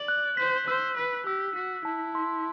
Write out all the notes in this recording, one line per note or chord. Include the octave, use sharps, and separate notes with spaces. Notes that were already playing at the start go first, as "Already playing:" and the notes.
Already playing: D5 F#7
F#6
C5 B6
C5 E6
B4 E6
G4 E6
F#4 B6
E4 A5
C6